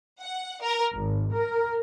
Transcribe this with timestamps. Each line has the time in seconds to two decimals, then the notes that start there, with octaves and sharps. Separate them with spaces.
0.20 F#5
0.62 A#4
0.94 G#1
1.34 A#4